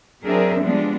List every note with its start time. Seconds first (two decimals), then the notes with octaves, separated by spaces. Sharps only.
0.24 F#3 C4 D4 G#4 A#4 E5
0.62 F3 G3 G#3 B3 D4